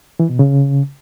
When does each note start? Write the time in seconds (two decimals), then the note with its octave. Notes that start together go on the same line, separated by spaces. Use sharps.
0.20 E3
0.29 B2
0.39 C#3